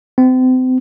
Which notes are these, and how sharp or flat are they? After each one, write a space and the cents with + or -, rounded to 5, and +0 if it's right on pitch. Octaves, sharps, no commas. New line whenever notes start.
C4 -35